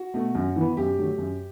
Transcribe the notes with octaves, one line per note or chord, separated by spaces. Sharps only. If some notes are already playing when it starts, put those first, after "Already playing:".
Already playing: F#4
B2 A3
F#2
E3 B3
F#2 G4
D3 F#3 A3
F#2